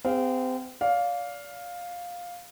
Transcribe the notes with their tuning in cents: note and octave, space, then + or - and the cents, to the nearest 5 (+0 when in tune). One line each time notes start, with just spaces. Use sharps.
C4 -35 G#4 -45 F5 -5
D5 -30 F5 +10